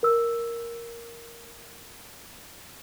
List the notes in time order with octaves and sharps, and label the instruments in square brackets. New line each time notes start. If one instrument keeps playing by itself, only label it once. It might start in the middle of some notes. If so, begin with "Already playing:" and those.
[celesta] A#4 E6